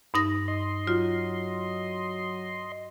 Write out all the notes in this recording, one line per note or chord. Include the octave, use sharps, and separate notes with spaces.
G2 D#4 A#6
D#5 C6
F#3 F4